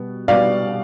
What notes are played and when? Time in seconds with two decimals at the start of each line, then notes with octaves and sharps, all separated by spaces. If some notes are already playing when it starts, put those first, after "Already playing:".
Already playing: B2 G3 B3
0.28 B2 G3 B3 D5 F5